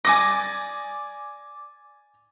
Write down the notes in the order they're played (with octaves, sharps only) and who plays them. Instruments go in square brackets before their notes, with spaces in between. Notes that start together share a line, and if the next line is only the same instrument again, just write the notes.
[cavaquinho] D5 D#6 [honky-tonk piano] G#5 D6 A#6